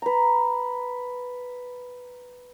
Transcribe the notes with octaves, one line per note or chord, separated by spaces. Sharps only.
B4 A#5